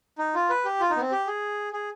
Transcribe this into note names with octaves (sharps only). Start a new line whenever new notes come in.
D#4
F4
B4
G4
F4
D#4
B3
C4
G4
G#4
G#4